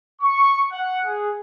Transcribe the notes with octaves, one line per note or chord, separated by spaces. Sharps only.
C#6
F#5
G#4